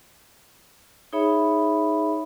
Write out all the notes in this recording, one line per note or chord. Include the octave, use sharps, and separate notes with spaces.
D#4 G#4 C#5 E5 B5